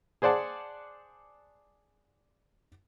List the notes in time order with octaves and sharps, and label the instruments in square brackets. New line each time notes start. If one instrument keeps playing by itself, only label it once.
[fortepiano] G#4 C5 D5 F#5 A5